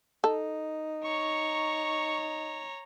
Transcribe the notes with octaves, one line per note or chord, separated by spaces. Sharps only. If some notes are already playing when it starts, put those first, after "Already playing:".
D#4 A4
C#5 A#5 C#6